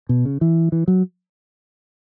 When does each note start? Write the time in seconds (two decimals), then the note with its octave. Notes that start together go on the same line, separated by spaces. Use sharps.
0.09 B2
0.25 C#3
0.41 E3
0.72 E3
0.88 F#3